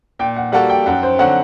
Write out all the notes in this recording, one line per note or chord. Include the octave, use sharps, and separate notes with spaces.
A#2 G5
F#5
G3 A#3 F#4 A4 F#5
G5
F#2 F#5
C5
D3 F#3 C4 F#4 F#5